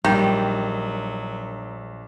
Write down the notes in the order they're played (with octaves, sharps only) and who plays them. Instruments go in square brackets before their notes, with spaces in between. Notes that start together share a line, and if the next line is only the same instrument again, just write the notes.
[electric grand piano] A#1 [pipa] D#3 [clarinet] F#3 [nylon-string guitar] G3